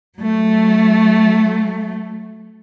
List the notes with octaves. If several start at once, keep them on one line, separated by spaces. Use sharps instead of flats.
F#3 A3